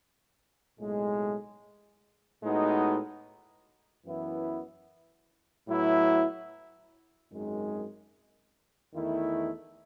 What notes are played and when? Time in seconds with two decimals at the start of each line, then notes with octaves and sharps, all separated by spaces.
0.79 B1 A2 G#3
2.42 A2 G#3 B3 D#4 F#4
4.05 F#2 E3 B3 E4
5.68 A2 F#3 B3 E4
7.31 G#1 F#2 D#3 G#3
8.94 E2 D#3 A3 E4